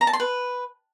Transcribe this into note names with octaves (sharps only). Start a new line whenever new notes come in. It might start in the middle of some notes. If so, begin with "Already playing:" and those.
A#5
A5
C6
B4